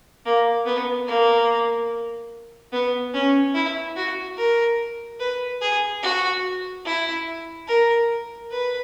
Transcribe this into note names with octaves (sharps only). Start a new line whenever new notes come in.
A#3
B3
A#3
B3
C#4
E4
F#4
A#4
B4
G#4
F#4
E4
A#4
B4